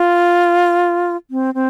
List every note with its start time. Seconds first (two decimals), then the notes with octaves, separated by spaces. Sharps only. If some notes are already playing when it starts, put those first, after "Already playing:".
Already playing: F4
1.31 C4
1.54 C4